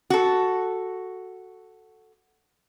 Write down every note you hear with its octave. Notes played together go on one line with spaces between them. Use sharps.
F#4 A4